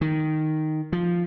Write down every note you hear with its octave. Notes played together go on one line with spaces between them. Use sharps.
D#3
F3